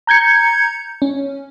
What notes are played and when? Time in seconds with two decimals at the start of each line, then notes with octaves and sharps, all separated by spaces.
0.07 A#5 G6 G#6 C#7
1.02 C#4